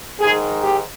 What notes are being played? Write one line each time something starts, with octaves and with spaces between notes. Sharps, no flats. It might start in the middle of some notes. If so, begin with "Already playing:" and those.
G#2 D#3 G#3 G#4
G4